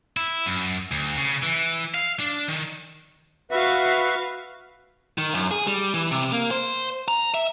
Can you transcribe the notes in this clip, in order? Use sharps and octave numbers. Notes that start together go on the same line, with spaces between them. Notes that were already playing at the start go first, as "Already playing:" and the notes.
E4
F#2
D2
C#3
E3
F5
D4
D#3
F#4 B4 E5 F5 C#6
D#3
F#2
G#4
G3
E3
C3
A#3
C5
A#5
E5